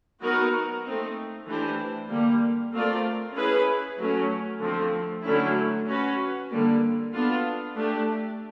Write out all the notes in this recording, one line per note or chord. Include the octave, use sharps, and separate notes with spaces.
F#3 B3 D#4 F#4 A#4
A3 C4 D#4
E3 A3 D4 G4 C5
D3 G3 A#3
A3 C4 F4 A#4 D5
C#4 E4 G#4 B4
F#3 A3 C#4
D3 F3 A3 C4
D3 F#3 A3 C#4 E4
C#4 F#4 B4
D3 G3 A#3
B3 D4 F4 A4
A3 D4 G4